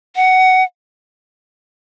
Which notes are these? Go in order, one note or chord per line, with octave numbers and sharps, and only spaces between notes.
F#5